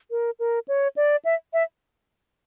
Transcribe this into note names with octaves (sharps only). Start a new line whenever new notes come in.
A#4
A#4
C#5
D5
E5
E5